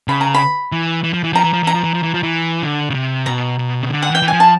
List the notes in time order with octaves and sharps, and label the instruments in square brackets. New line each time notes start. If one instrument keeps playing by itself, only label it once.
[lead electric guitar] C#3 [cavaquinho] B5
[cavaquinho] A#5
B5
[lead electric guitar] E3
E3
F3
E3
[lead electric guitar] F3 [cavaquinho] A#5
[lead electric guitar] E3
F3
[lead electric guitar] E3 [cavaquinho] A#5
[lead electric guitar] F3
E3
F3
E3
F3
E3
D3
C#3
C3
[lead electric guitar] B2 [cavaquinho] A#5
[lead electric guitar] B2
C#3
D3
[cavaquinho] F#5
[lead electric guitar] E3
[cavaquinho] G5
[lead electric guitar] E3
[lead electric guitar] F3 [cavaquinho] G#5
[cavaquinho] A5